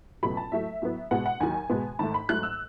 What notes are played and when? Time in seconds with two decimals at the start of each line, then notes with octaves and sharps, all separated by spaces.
0.23 C#2 B2 F#3 A3 B5
0.37 A5
0.52 A2 F#3 A3 E5
0.82 A2 F#3 B3
1.11 B2 G#3 B3 F#5
1.26 F#5
1.40 D#2 D#3 F#3 G#5
1.69 B2 G#3 B3
1.99 G#2 D#3 A3 A5
2.14 B5
2.29 G#2 F#3 A3 F#6
2.43 E6